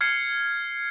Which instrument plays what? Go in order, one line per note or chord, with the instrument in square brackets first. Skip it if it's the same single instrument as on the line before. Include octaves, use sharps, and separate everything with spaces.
[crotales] F6 G#6 C7 C#7